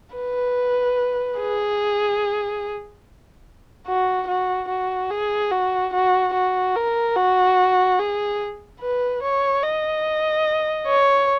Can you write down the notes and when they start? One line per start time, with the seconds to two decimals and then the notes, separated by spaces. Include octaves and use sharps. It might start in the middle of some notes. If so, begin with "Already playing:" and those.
0.16 B4
1.40 G#4
3.86 F#4
4.28 F#4
4.68 F#4
5.10 G#4
5.51 F#4
5.93 F#4
6.33 F#4
6.75 A#4
7.16 F#4
7.99 G#4
8.80 B4
9.22 C#5
9.63 D#5
10.87 C#5